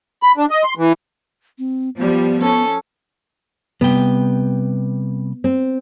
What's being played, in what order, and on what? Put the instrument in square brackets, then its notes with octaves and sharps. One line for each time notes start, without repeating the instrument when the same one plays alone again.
[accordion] B5
D4
D#5
C6
E3
[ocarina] C4
[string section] F3 G3 [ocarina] B3
[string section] C#4 [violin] A4
[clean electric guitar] C3 G3 G5 [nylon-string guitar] B3
[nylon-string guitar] C4